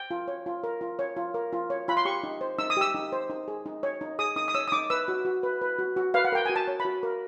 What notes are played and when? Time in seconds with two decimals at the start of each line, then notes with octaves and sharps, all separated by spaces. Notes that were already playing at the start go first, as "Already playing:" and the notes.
Already playing: G5
0.11 F4
0.28 C#5
0.46 F4
0.64 A#4
0.81 F4
0.99 C#5
1.16 F4
1.34 A#4
1.53 F4
1.70 C#5
1.88 F4 B5
1.97 C6
2.05 G4 C#6
2.23 D#4
2.41 C5
2.59 D#4 E6
2.70 D#6
2.77 G4 E6
2.95 D#4
3.12 C5
3.30 D#4
3.48 G#4
3.66 D#4
3.83 C#5
4.01 D#4
4.19 G#4 D#6
4.36 D#4 D#6
4.48 D#6
4.55 C#5 E6
4.68 D#6
4.72 D#4 D6
4.90 B4 E6
5.08 F#4
5.25 F#4
5.43 B4
5.62 B4
5.79 F#4
5.97 F#4
6.14 B4 F5
6.25 F#5
6.32 A#4 G5
6.46 F#4 G#5
6.56 A5
6.68 C#5
6.80 B5
6.85 F#4
7.03 A#4